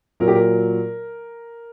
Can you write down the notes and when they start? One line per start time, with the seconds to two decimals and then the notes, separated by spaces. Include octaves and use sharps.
0.20 A#2 F#3 A#4
0.28 G4
0.35 A#4